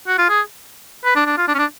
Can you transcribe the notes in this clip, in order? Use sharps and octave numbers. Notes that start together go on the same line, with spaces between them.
F#4
F4
G#4
B4
D4
D4
F4
D4
C#4
D4